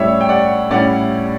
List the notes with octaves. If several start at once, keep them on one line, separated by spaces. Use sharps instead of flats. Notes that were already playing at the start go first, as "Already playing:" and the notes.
Already playing: A2 G3 C#4 C#5 E5
G5
D5 F#5
A2 G3 C#4 E4 D5 F#5